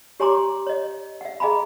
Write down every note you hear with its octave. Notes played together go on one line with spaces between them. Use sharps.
G4 C#5 G#5 A#5 C6 D6
C#5 D#5
E5 F#5
G#4 D#5 F5 G#5 A#5 B5